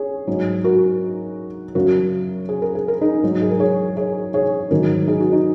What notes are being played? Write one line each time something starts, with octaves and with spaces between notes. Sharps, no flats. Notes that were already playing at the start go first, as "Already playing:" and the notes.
Already playing: G#4 C#5
G#2 F#3
F#4 A#4
F#2 C#3 F#3 F#4 A#4
G#4
A#4
G#4
A#4
D#4 G#4
G#2 F#3
G#4
A#4
G#4 C#5
G#4 C#5
G#4 C#5
G#2 D#3 F#3 F#4 A#4
D#4 G#4
F#4
D#4